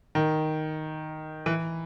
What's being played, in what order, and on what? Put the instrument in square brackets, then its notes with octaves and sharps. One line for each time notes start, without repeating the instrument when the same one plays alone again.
[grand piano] D#3
E3